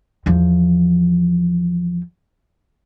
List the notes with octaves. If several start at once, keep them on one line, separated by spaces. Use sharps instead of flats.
E2 F3